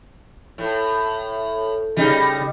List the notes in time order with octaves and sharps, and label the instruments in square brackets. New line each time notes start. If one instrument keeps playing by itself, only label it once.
[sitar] A2
[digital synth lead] C#3 [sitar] G3 D#4